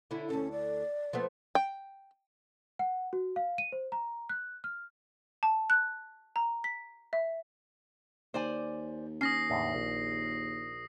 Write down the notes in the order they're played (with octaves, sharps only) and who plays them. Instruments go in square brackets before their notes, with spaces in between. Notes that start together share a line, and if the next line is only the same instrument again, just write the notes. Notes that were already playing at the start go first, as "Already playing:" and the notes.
[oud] D3 C#4 E4
[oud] D2 A4 [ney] C#4
[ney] D5
[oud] F3 A3 B3
[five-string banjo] G5
[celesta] F#5
F#4
F5
D#7
C5
A#5
F#6
F6
[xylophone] A5
F#6
A#5
B6
E5
[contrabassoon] D#2 [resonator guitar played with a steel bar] C5 D5 G#5
[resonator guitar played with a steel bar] C#4 [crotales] D#6 A#6 C7
[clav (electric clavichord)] E2 A2 D3
A#1